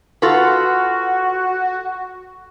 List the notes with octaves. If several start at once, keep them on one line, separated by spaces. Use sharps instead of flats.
F4 F#4 A4 B4